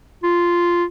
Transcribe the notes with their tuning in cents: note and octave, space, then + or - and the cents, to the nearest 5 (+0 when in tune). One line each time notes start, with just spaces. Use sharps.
F4 -5